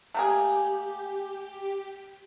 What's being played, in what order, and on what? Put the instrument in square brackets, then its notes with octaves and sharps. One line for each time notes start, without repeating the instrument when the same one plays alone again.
[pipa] A3 A#3 G#4 [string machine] G4